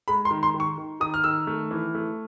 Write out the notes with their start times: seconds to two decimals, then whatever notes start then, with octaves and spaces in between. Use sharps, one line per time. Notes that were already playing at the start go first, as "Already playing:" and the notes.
0.08 G#3 B5
0.25 C6
0.31 D#3
0.43 C6
0.54 D#3
0.60 C#6
0.78 D#3
1.00 D#3 D#6
1.14 F6
1.24 D#3 E6
1.47 A3
1.71 E3
1.95 A3